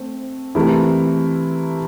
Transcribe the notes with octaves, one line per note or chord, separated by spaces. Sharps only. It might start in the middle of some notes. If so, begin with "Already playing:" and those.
Already playing: A3 C4
C3 E3 A3 E4 A#4